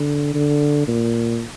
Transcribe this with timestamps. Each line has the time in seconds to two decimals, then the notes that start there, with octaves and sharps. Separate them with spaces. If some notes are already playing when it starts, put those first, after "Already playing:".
Already playing: D3
0.34 D3
0.88 A#2